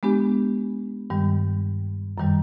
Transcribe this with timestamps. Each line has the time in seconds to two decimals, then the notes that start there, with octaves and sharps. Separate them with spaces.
0.03 G#3 B3 D4 G4
1.10 G2 D#3 G3
2.18 F#2 D#3 G3